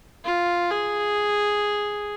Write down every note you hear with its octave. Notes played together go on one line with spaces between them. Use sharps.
F4
G#4